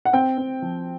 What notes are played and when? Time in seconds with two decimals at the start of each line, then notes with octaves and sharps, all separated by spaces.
0.05 F#5
0.13 C4 G5
0.38 C4
0.62 F3